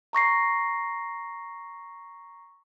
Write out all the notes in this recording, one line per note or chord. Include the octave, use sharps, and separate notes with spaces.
A#5 C#6 A#6 C7